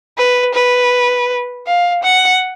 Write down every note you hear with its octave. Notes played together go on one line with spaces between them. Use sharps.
B4
B4
F5
F#5